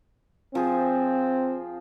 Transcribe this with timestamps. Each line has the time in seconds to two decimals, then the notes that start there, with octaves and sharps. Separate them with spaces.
0.55 F3 C4 G#4